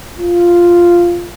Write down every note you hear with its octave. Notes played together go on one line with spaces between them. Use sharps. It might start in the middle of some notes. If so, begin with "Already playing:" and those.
F4